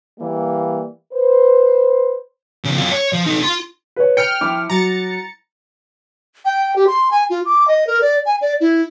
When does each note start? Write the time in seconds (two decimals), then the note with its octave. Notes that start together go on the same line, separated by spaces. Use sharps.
0.20 E3 G3 A#3
1.12 B4 C5
2.65 C#3 F3
2.78 F#2 F4
2.92 C#5
3.13 F3
3.26 D#4 A4
3.43 F4 C6
3.96 B4 C#5
4.17 G5 F6 C#7
4.41 F3 E4 D6
4.70 F#3 A#5 A6 C#7
6.45 G5
6.76 G4
6.87 C6
7.11 G#5
7.30 F4
7.46 D6
7.68 D#5
7.87 A#4
8.02 D5
8.26 G#5
8.41 D5
8.61 E4